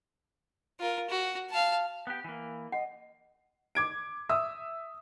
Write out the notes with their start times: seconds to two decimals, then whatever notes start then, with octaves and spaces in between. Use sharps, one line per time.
0.80 F4 A#4
1.09 F#4
1.50 F5 A5
2.07 B3 G4
2.24 E3 A#3
2.72 D#5 F#5
3.75 D6 G#6 D7
4.29 E5 D#6 E6